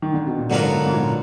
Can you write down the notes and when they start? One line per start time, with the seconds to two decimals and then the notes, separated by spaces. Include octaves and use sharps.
0.02 D#3
0.14 D3
0.27 B2
0.38 A#2
0.50 G#2 D3 F#3 B3 F4 A#4
0.72 B2
0.86 G#2
0.93 A#2